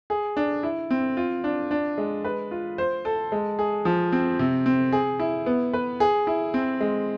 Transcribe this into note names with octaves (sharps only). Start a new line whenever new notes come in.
G#4
D4
E4
C4
F4
D4
D4
G#3
B4
F4
C5
A4
G#3
G#4
F3
C4
C3
C4
G#4
E4
B3
B4
G#4
E4
C4
G#3